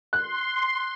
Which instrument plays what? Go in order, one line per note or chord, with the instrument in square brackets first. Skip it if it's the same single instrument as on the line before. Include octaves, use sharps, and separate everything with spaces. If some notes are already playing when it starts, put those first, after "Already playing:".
[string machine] C6 [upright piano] F#6